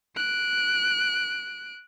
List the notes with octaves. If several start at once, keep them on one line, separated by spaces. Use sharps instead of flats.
F#6 D7